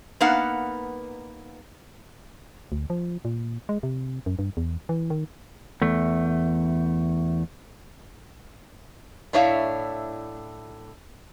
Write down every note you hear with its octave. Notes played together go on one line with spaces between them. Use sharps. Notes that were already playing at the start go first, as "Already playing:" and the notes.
A#3 B3 D#4 B4 F5 F#5
D2
F3
A#2
G#3
C3
F#2
G2
E2
E3
D#3
E2 A3
A2 D4 E4 C#5 E5 F5